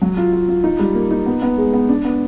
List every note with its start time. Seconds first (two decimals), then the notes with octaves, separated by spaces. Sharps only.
0.02 F#3
0.17 F4
0.33 F4
0.48 F4
0.64 D#4
0.79 G3
0.95 A#3
1.11 D#4
1.26 B3
1.42 B3
1.58 G#3
1.73 B3
1.89 D4
2.05 B3